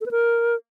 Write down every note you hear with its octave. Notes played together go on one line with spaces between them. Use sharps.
A4
B4
A#4